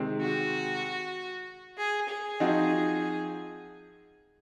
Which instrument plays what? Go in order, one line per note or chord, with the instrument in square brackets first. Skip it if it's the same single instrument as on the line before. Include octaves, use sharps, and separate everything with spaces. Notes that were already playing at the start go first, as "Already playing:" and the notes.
Already playing: [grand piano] C3 D#3 G#3 C4
[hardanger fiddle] F#4
G#4
G#4
[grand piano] F3 C4 D#4 F#4